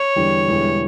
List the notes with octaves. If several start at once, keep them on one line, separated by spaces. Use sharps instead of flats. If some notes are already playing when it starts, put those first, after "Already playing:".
Already playing: C#5
E2 D3 G3
E1 E2 D3 G3